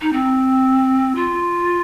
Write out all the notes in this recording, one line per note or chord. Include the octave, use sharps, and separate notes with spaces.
D#4
C4
F4